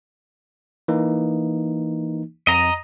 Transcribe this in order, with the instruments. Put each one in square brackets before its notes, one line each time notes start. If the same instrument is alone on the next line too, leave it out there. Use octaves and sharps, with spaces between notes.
[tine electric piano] E3 A#3 D#4
[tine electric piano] F2 [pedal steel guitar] D#5 A#5